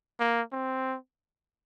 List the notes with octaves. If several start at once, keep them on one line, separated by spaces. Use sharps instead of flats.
A#3
C4